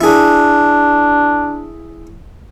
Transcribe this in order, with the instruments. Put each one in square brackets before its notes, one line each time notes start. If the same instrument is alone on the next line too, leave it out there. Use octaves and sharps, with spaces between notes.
[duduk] D4 [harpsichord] E4 G#4